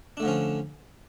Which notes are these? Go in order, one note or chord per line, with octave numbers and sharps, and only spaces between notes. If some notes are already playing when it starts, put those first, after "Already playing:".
D3 F3 A3 C#4 D4